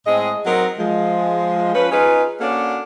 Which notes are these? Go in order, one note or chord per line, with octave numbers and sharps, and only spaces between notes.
A2 G#3 C4 D#5
F#3 C4 D#4 F#4 A#4
F3 G#3
F3 C#4 B4
C#4 D#4 F4 G#4 B4
A#3 C#4 D4 F#4 A4